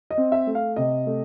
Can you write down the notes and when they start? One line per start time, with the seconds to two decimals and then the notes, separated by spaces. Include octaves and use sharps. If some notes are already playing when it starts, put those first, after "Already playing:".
0.10 D#5
0.17 C4
0.32 E5
0.47 A3
0.55 F5
0.76 C3 D#5
1.06 A3